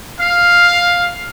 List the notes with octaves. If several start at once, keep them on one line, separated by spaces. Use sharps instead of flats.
F5